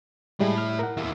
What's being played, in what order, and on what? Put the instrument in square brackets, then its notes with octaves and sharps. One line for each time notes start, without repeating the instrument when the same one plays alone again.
[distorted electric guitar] A2 E4 [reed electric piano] G3 G#3
[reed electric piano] F6
A#4 F#5
[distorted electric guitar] D#2 E3